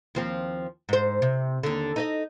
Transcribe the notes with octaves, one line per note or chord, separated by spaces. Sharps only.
D#2 F3 C4
G#2 C5
C3
D#2 D3
D#4 B4 D#5